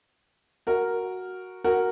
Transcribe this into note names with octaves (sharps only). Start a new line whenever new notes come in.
F#4 A#4
F#4 A#4